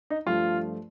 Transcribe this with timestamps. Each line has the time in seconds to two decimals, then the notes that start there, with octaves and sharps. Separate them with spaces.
0.10 D#4
0.26 G2 F3 A3 F4